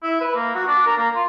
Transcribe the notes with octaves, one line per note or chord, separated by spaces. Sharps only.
E4
B4
A#3
F#4
D4
A#4
A#3
F4